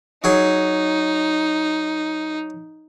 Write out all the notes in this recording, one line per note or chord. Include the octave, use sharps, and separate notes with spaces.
F#3 D#4 G#4